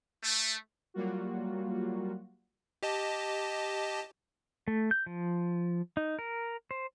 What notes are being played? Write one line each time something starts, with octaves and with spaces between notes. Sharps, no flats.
A3
F#3 G3 A#3 F4 F#4
G4 D#5 A5
A3
G6
F3
D#4
A#4
C5